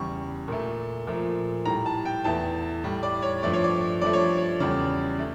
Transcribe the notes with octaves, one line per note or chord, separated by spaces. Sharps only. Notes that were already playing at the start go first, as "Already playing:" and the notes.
Already playing: E2 C#3 G3 C#6
A#2 A3
A#2 F3 A3
A2 G3 A#5
A5
G5
E2 E3 A3 A5
A2 G3
D5
C#5
G2 F3 A3 D5
C#5
D5
G2 F3 A3 D5
C#5
C#5
E2 C#3 G3 D5
A3